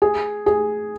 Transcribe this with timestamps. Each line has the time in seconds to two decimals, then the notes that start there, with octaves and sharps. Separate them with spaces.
0.02 G#4
0.46 G#4